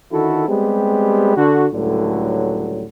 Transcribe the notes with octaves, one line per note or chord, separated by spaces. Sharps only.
D3 D#3 E4 F#4 A4
G3 G#3 B3 C4 G4
D3 F#4
C#2 A2 D3 F#3 G3